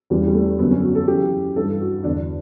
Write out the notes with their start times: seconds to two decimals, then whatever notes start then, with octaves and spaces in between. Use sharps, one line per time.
0.10 E2 C#3 E3 G3
0.27 G3
0.34 A3
0.59 F#2 D3 B3
0.71 C#4
0.83 F#4
0.95 A4
1.08 F#2 C#3 E3 G4
1.56 G2 E3 A4
1.81 F#4
2.04 E2 D3 D4